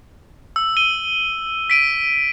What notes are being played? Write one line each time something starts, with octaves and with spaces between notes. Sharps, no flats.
E6
D#7 G7
B6 D7 D#7